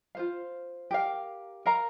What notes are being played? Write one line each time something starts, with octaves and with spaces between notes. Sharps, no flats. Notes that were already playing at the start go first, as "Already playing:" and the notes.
F4 C5 F5
G4 A#4 F5
A#4 F5 A#5